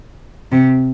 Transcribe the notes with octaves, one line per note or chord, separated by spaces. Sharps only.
C3